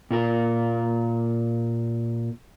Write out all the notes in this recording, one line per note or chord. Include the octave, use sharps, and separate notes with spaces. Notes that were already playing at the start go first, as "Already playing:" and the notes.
A#2 F4 A#4